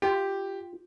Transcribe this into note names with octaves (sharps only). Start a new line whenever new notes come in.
F4 G4